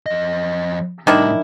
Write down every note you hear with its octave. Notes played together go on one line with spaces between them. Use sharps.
F2 D#5
A2 D#3 G3 D4 E4